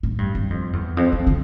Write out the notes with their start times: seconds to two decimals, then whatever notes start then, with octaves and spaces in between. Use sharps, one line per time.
0.03 A2
0.18 G2
0.35 G2
0.50 F2
0.73 E2
0.97 F2
1.12 F2
1.27 D3